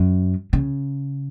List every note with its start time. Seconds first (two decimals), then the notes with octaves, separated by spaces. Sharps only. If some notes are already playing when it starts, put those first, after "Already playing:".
Already playing: F#2
0.53 C#3